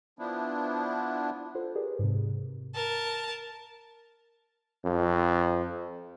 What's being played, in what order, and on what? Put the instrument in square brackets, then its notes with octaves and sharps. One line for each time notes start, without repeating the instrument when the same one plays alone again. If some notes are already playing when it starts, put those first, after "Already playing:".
[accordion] F3 B3 D4 E4
[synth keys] F4 A4 C5
G4 G#4 A#4 B4 D5
G#2 C3
[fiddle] A#4 A5
[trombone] F2